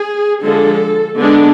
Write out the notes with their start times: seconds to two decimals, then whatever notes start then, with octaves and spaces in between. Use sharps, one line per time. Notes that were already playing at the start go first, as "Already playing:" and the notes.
Already playing: G#4
0.43 D3 F3 G#3 D4 A4
1.19 D3 G#3 B3 D4